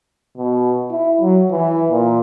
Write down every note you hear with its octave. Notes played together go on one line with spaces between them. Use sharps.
B2
E4
F#3
E3
A#2